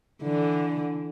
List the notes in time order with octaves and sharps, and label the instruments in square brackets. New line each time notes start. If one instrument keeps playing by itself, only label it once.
[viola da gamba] D3 E3